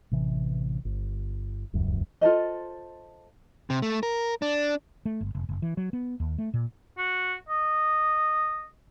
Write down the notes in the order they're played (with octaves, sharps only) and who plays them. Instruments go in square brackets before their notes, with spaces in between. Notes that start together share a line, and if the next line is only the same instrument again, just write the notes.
[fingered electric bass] A1 C3 E3
G1
D#1 C#2 F#2
[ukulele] F4 A4 C5 D#5
[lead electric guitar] C3
A3
A#4
D4
[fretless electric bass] A3
G1
F1
F#1
E3
F#3
B3
D#2
A3
A#2
[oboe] F#4
D#5